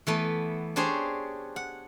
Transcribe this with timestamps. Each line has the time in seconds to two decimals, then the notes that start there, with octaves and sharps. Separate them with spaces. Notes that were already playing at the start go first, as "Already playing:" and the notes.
0.07 E3 A3 B3
0.76 D4 G4 G#4 C5 C#5
1.56 F#5